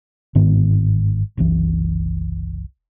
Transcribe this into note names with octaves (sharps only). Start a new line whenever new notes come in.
G1 G#2 D#3 B3
F#1 C2 E3